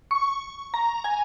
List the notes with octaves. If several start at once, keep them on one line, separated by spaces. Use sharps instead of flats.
C#6
A#5
G#5